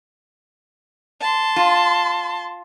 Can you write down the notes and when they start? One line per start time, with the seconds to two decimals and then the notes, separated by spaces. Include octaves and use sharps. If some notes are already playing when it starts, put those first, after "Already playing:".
1.21 A5 C6
1.56 F4